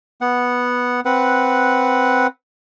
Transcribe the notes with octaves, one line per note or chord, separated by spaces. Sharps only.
B3 F#5
C4 B4 F#5